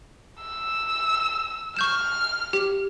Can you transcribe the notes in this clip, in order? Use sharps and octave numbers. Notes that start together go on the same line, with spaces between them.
E6
C#6 F6 G6 E7
G4